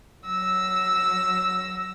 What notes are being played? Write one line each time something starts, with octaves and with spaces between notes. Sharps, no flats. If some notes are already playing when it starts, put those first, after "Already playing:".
F#3 E6 A#6